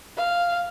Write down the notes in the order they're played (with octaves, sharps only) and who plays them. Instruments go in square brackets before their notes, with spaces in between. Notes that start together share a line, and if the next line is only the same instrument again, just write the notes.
[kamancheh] F5